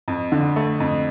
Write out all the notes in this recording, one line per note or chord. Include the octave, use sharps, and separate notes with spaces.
F2
D3
A3
F2